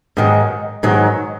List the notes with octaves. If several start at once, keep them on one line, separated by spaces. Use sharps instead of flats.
G#2 D#3 F#3
G#2 D#3 F#3